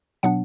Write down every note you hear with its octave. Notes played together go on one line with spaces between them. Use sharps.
B2 F#3 B3 D4 F#5